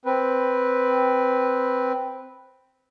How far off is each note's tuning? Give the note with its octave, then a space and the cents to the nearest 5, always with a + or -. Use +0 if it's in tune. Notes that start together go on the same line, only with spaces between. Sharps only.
C4 +0 B4 +0